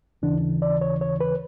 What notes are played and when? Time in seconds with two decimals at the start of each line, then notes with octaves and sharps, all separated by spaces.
0.22 D#2 C#3 E3 D4
0.62 D5
0.81 C#5
1.01 C#5
1.20 B4